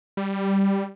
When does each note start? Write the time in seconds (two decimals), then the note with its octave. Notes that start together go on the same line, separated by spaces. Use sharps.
0.17 G3